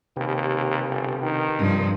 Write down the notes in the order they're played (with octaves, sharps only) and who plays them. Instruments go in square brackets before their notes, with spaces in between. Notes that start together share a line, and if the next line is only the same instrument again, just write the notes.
[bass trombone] D#2 [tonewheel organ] C3 G4 B4
[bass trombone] G1
D#3
[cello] G2 F3 [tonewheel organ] C3 A#4 D#6